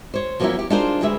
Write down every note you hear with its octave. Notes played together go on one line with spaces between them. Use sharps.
C5 C#5
F3 F#3 A#3 B3 C#4 E4
G4
D4 D#4 F4 G#4 A#4 C5
D2 G3 G#3 G#4 B4 E5